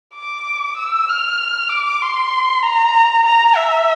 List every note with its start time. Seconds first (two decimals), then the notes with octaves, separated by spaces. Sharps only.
0.15 D6
0.77 E6
1.09 F6
1.70 D6
2.02 C6
2.63 A#5
3.26 A#5
3.57 E5